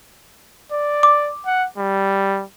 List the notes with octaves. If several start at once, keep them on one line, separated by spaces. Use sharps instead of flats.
D5
D6
F#5
G3